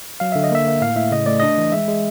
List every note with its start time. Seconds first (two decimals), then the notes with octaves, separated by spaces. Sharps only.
0.20 F#3 F5
0.32 D3 E5
0.44 D#5
0.51 A#3 E5
0.67 A#3
0.81 A2 F5
0.96 A2 E5
1.12 C#3 D#5
1.26 A3 D5
1.40 D4 D#5
1.58 E3
1.72 G#3 E5
1.88 G#3